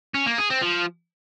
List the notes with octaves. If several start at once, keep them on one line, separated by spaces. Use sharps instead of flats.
C#4
A#3
G#4
C4
F3